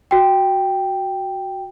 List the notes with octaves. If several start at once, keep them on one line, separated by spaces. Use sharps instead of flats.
F#4 G5